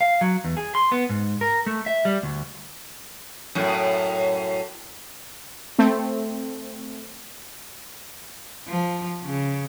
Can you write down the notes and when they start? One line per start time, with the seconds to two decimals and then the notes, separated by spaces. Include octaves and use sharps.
0.01 F5
0.21 F#3
0.44 E2
0.57 G#4
0.75 C6
0.92 B3
1.09 G#2
1.41 A#4
1.66 A3
1.86 E5
2.05 G3
2.23 D2
3.55 F#2 A2
5.79 A3 C4
8.67 F3
9.23 C#3